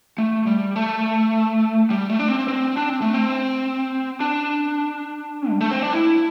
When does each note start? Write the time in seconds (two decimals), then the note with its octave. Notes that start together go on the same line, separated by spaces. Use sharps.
0.18 A3
0.47 G3
0.76 A3
1.90 G3
2.10 A3
2.19 D4
2.28 C4
2.48 C4
2.77 D4
2.89 C4
3.02 A3
3.14 C4
4.20 D4
5.50 G3
5.61 A3
5.71 C4
5.82 D4
5.93 E4